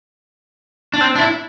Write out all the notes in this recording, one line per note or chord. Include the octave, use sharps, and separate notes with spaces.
D4
C4
D4
E4